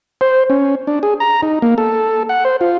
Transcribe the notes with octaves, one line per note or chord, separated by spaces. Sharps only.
C5
C#4
D4
G#4
A#5
D#4
A#3
A4
F#5
C5
F4